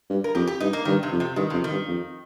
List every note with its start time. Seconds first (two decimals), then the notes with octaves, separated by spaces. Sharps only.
0.10 G2
0.24 A#4
0.35 F2 G4
0.47 G4
0.60 G2 D#4
0.73 A#3
0.85 G2 D#3
1.03 C3
1.12 F2
1.20 C3
1.36 G2 D#3
1.50 F2 C3
1.64 D#3
1.71 G2
1.88 F2